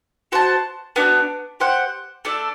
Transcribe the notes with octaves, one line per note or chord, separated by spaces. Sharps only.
F#4 C5 F#5 A5
B3 D4 F#4
G4 C5 F#5
A3 D4 A4